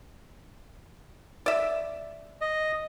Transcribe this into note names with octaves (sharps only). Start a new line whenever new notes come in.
D5 E5
D#5